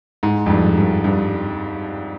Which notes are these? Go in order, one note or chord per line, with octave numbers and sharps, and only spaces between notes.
G#2
F2
G2
G2
G2